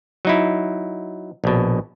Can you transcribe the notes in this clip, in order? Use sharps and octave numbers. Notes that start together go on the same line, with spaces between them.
F#3 D#4 E4
A#1 B2